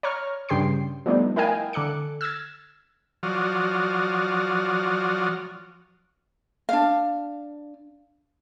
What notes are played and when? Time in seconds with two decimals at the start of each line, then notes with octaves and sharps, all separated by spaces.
0.03 C#5 A#5 C#6 F6
0.49 G2 C#3 G4 G5 C6 C7
1.06 F3 G3 A3 B3 D4 D#4
1.36 E4 A#4 D#5 F5 G5 G#5
1.73 D3 A4 D6 F#6 C#7
2.21 E6 F6 G#6 A6
3.23 F3 F#3 F#4 D5 D#6 F6
6.69 D4 F5